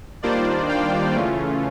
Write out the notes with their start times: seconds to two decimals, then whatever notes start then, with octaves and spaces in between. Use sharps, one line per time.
0.22 D#3 G3 A#3 D4 F4 C5 D5
0.69 F5 G5
1.14 C#3 E3 A3 C#4 F4